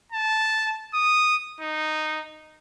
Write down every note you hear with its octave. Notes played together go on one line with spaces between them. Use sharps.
A5
D#6
D#4